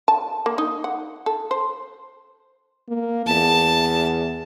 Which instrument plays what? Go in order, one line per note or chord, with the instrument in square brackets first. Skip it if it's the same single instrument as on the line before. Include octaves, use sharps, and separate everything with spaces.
[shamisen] A5
A#3
D#4
F#5
A4
C5
[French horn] A#3
[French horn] E2 [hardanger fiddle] A5